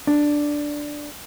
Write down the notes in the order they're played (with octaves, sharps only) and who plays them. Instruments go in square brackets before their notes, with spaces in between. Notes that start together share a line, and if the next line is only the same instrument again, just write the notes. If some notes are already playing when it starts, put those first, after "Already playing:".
[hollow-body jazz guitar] D4